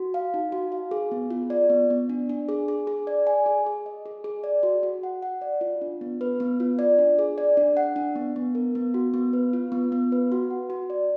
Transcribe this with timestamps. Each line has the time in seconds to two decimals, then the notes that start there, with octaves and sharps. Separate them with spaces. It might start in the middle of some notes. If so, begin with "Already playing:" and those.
Already playing: F#4
0.14 F5
0.34 D#4
0.52 F#4
0.72 F5
0.91 G#4
1.11 B3
1.30 F4
1.50 D5
1.70 B3
1.90 B3
2.09 D4
2.29 D4
2.49 G#4
2.68 G#4
2.87 G#4
3.07 D5
3.27 G#5
3.46 G#4
3.66 G#4
3.86 D#5
4.06 G#4
4.24 G#4
4.44 D5
4.63 F#4
4.83 F#4
5.03 F#5
5.22 F#5
5.42 D5
5.61 F4
5.81 D4
6.01 B3
6.21 B4
6.40 B3
6.60 F4
6.79 D5
6.98 D4
7.19 G#4
7.38 D5
7.57 D4
7.77 F#5
7.96 D4
8.16 B3
8.36 B3
8.55 A#4
8.75 B3
8.94 F#4
9.14 B3
9.33 B4
9.53 F4
9.72 B3
9.92 B3
10.12 B4
10.32 F#4
10.51 F#5
10.70 F#4
10.90 D5